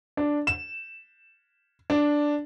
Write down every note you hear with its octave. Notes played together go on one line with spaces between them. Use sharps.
D4
E7
D4